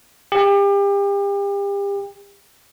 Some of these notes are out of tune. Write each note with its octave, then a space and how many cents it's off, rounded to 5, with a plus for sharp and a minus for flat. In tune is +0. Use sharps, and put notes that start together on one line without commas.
G4 +35